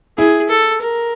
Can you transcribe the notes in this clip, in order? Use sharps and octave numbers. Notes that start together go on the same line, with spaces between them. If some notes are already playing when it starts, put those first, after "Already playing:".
E4 G#4
A4
A#4